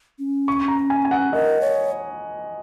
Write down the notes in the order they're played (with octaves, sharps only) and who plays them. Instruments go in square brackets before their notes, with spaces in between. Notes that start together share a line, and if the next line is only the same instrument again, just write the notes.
[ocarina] C#4
[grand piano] C#6
A#5
G#5
G#5
F#5
[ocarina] A#4 [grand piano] D#5
[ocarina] C#5